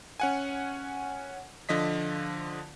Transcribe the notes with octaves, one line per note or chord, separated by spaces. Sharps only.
C#4 F#5 G#5
D3 F3 D#5 B6